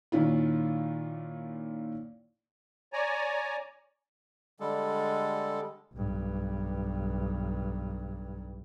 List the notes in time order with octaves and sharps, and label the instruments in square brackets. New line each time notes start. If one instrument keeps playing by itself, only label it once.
[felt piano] A#2 D#3 C#4 E4 F4
[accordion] C#5 D5 G#5 A#5
[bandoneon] D3 G3 G#3 A4
[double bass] B1 G2